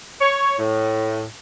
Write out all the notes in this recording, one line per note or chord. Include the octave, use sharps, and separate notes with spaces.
C#5
A2